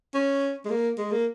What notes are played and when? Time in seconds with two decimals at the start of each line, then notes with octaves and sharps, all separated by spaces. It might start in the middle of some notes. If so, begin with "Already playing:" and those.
0.14 C#4
0.65 G#3
0.70 A#3
0.98 G#3
1.12 A#3